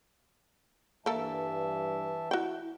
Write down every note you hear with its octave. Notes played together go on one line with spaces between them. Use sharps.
G2 E3 A#3 A4 E5 A5
E4 F#4 G5